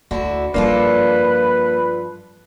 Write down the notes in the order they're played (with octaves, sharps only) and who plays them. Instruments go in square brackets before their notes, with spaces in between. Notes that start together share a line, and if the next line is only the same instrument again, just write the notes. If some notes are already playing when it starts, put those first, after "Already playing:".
[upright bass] D2 [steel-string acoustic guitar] D3 E4 F#4
[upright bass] G2 F3 [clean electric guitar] A#3 [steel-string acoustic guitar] D4 F4 A4 [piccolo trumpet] B4